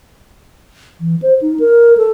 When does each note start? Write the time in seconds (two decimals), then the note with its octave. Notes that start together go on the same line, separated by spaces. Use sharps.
1.01 E3
1.22 C5
1.41 D#4
1.59 A#4
1.97 A4